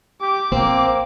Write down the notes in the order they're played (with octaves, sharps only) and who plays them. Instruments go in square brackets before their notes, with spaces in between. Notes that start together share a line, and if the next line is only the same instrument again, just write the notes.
[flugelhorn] G4 [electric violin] D6
[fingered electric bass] A#1 [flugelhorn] A#3 [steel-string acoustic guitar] C4